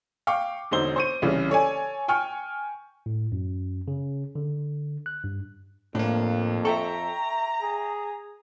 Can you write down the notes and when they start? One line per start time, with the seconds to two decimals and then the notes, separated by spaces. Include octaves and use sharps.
0.27 F5 G5 C#6 D6
0.71 E1 D3 D#4 C5 G7
0.96 C5 C#6 D#7
1.22 C2 C#3 E3
1.50 A4 C#5 D5 G#5
2.08 G5 G#5 C#6 F6
3.06 A2
3.32 F#2
3.88 C#3
4.35 D3
5.06 F#6
5.24 G2
5.95 F2 A2 A#3 D4
6.65 A4 E5 G5 A#5 C#6
7.61 G#4